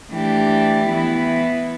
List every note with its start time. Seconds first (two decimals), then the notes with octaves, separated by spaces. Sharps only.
0.11 E3 A3 D4 G4
0.86 E3 B3 E4